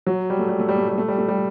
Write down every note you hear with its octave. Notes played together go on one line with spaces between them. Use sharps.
F#3
G3
A3
G3
A3
G3
A3
G3
A3
G3
A3
G3